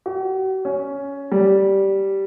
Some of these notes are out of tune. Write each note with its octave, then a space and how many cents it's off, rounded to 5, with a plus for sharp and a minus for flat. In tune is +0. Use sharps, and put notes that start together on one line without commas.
F#4 +45
C#4 +10
G3 -10